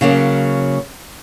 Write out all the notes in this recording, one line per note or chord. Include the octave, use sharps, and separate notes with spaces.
C#3 F#3 A#3